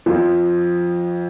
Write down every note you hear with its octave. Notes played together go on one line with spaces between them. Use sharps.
F2 F3